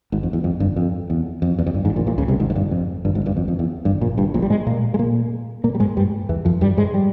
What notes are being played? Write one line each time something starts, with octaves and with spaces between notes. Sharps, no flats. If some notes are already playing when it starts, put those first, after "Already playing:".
G#1 G#2
F2
E2
F2
G1 G2
F2
E2
F2
E2
F2
G1 G2
G#1 G#2
A#1 A#2
A#1 A#2
C#2 C#3
C2 C3
G#1 G#2
G#2
G1 G2
F2
G1 G2
G#1 G#2
G1 G2
F2
F2
E2
G1 G2
A#1 A#2
G1 G2
A#1 A#2
G3
G#2 G#3
A#2 A#3
G#3
A#2 A#3
A#2 A#3
G3
G#2 G#3
G2 G3
E2 E3
F2 F3
G2 G3
G#2 G#3
G3